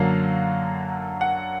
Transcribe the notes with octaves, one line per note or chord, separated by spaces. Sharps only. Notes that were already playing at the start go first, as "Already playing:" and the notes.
Already playing: F#2 D3 F#3 A#3 F5
F#5